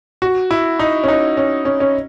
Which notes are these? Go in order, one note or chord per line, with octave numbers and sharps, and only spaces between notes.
F#4
E4
D#4
C#4
D#4
C#4
C#4
C#4